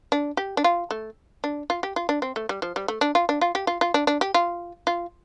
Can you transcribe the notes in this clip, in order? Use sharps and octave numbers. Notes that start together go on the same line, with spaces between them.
D4
G4
D4
F4
A3
D4
F4
G4
F4
D4
C4
A3
G3
F3
G3
A3
D4
F4
D4
F4
G4
F4
F4
D4
D4
G4
F4
F4